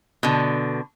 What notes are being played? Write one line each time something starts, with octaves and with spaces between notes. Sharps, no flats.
B2 D3